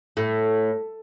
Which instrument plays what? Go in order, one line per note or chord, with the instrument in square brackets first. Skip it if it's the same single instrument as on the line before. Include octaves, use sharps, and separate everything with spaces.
[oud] A2